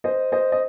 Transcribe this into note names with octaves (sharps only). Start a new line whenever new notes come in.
C5 D#5
C5 D#5
D#5